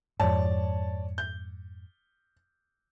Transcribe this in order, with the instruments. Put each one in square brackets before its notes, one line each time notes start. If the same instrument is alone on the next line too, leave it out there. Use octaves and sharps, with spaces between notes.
[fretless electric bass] F2 G#2 [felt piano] C#5 D5 A5
[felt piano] G6